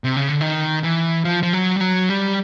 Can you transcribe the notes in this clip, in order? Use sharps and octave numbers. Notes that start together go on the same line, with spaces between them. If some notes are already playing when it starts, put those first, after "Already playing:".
C3
C#3
D3
D#3
E3
F3
F3
F#3
G3
F#3
G3